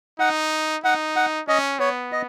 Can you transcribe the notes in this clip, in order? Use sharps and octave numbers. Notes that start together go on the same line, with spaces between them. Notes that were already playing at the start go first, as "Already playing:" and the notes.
D#4 F#5
D#4 F#5
F#5
C#4 D#5
B3 C#5
D#5